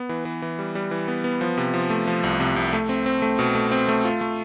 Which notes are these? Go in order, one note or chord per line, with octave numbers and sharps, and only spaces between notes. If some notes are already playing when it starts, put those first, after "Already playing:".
Already playing: B3
E3
E3
E3
G3
G3
E3
B3
B3
F3
C3
F3
A3
F3
C2
C3
C2
A3
C4
C4
A3
B2
A3
C4
A3
F4
A3